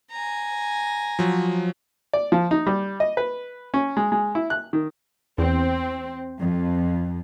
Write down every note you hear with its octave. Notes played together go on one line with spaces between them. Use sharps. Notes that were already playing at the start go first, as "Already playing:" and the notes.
G#5 A#5
F3 F#3
D5
F3
D#4
G3
D#5
B4
C#4
G#3
G#3
E4
F#6
D#3
E2 C4
F2